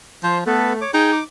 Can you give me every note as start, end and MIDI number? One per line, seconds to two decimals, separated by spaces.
0.23 0.43 53
0.23 0.38 72
0.46 0.81 57
0.46 0.73 59
0.46 0.73 69
0.46 0.73 71
0.81 0.91 73
0.81 0.91 86
0.94 1.20 63
0.94 1.11 68
0.94 1.11 79
1.12 1.24 86